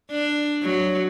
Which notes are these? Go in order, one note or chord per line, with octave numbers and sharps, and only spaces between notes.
D4
F#3